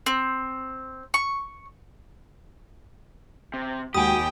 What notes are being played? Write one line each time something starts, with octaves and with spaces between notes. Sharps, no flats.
C4
C#6
C3
D#2 G#3 F#4 G4 G5 G#5 B5 D#6